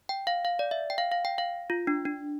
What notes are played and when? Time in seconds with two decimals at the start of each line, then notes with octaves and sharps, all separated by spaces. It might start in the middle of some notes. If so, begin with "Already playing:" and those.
0.09 G5
0.27 F5
0.45 F5
0.59 D5
0.71 E5
0.90 G5
0.98 F5
1.12 F5
1.25 G5
1.38 F5
1.70 F4
1.87 D4
2.05 D4